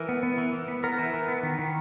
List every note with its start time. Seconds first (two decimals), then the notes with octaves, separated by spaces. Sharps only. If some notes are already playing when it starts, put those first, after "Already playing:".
Already playing: E3 A#4
0.09 B3
0.23 B3
0.38 E3
0.53 E3
0.68 B3
0.84 B3 A#4
0.98 E3
1.14 E3
1.28 B3
1.43 D#3
1.59 D#3